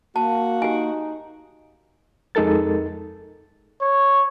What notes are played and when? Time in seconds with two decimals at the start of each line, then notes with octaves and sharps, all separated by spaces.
0.16 A#3 F#4 A5
0.62 D#4 G4 G#5
2.35 F2 G#3 D#4 A4 A#4 A6
3.81 C#5